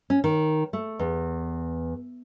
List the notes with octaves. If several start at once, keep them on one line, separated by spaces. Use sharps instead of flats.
C#4
D#3
A3
E2